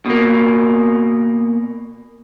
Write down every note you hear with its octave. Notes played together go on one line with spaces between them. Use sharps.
B2 A#3